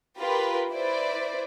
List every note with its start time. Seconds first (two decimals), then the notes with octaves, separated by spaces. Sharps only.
0.18 F4 G4 A#4 B4
0.72 E4 B4 C5 D5